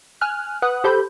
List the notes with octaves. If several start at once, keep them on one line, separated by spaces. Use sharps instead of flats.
G#5 F6 F#6
B4 F#5 D#6 F#6
G4 A4 C5 B5 G6